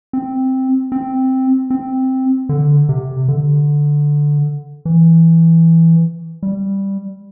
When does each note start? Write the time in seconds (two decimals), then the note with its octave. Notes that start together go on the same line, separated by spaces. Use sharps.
0.13 C4
0.92 C4
1.70 C4
2.49 D3
2.89 C3
3.28 D3
4.85 E3
6.43 G3